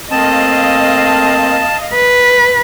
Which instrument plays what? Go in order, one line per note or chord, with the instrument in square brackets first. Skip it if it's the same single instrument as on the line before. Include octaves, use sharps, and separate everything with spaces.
[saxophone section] A3 A#3 C4 [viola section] D#5 F5 [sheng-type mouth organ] A5
[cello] B4